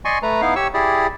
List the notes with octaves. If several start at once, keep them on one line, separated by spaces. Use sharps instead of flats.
D5 D#5 G#5 C6 C#6
A3 B4 A#5
B3 D#4 E4 F5
G4 C#5 C#6 E6
E4 G4 G#4 D5